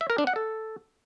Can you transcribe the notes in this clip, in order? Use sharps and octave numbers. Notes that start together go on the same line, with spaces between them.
E5
A#4
D4
F#5
A4